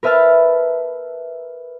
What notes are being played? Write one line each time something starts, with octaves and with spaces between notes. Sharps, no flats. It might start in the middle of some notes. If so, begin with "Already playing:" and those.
A#4 B4 E5 A5 F6